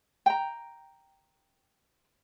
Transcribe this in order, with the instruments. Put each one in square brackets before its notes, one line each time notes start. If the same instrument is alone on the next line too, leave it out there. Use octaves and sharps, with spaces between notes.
[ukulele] G5 A#5